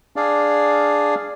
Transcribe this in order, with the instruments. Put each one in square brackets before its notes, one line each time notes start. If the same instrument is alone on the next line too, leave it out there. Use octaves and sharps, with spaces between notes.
[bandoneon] D4 G#4 D5 F5